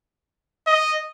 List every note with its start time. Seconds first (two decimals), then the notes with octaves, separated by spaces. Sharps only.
0.67 D#5